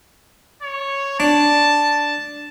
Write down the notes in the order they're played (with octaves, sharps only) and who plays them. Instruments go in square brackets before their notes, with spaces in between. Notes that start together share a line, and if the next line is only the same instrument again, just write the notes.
[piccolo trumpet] C#5
[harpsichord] D4 [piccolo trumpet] A5